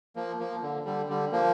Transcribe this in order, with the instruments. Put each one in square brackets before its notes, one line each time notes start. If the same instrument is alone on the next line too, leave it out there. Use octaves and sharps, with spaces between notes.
[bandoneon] F3 A#3
F3 A#3
D3
D3 G3
D3 G3
F3 A#3